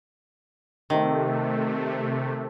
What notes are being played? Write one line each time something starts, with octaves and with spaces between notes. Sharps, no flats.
C3 D#3 A3